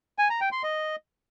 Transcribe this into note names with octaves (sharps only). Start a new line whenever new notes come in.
G#5
A#5
G5
C6
D#5